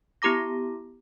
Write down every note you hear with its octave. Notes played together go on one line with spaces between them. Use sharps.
B3 E4 G4 A#5 D6 A#6